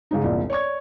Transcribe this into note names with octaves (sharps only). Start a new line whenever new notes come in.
G#2 C#3 G#3 C#4 D#4
E1 C2 A#2
C#5 D5 C#6 G#6